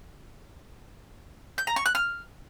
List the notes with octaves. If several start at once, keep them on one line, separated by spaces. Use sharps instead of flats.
G6
A#5
C#6
F#6
F6